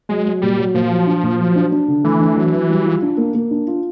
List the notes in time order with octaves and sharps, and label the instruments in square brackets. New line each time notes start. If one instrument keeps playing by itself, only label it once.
[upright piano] F#3 [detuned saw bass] G#3
[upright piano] F#3
[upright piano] A#2 [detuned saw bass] G3
[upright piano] F#3
[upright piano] A#2 [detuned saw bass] F3
[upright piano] F#3
D4
A#2
F#3
D4
D4
D3
[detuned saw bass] E3 [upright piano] A3
[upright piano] D4
F#3
F#3
G3
F4
D4
A#3
A#3
D4
F4